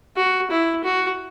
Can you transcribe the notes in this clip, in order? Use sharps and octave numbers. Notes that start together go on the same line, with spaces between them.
F#4
E4
F#4